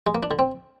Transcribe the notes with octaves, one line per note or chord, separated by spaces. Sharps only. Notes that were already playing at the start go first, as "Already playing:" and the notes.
G#3
A#3
D4
D3
C4